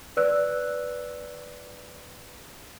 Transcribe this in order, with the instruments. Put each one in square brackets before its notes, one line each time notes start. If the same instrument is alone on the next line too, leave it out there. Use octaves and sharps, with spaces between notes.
[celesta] B4 D5 E6 F#6